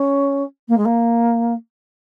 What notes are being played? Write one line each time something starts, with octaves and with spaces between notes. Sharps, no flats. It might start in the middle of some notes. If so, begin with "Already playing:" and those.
Already playing: C#4
A#3
G#3
A#3